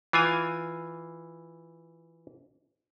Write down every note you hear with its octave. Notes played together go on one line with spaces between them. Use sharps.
E3 F4 G#5